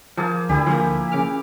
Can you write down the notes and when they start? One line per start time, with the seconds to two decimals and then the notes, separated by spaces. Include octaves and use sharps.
0.17 F3 A#3 G#4 A5
0.49 D2 D3 E4 G4 G#5
0.66 F3 A#3 G#5
1.12 C#3 D6 F6